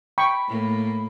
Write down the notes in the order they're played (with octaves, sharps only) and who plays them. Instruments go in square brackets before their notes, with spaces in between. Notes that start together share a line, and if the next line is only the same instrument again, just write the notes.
[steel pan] G5 C#6 [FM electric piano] B5
[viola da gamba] A2 A#3